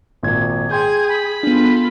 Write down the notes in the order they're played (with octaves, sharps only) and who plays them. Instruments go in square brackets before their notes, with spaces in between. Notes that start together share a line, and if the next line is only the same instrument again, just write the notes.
[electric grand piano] G#1 A#2 G#6
[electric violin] G#4 [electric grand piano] G5 C6 G6 [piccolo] G#6
[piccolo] B5
[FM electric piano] B3 D4 [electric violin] F4 A4